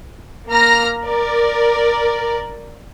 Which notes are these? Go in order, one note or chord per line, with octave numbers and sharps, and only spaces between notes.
A#3 A#5 F6 A#6
A#4 D5